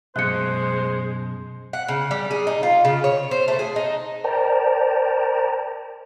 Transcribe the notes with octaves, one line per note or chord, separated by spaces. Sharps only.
F#2 B2 G#3 C5 D#5 F#6 C#7
F#5
C#3
G3
G#4
D#4
F4
C#3
C#5
C5
A3
G#4
D#4
A#4 C5 D5 G5 A5 A#5